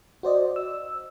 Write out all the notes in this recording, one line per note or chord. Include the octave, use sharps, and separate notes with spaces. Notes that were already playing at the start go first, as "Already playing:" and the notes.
F#4 C5 D5 D#5
E6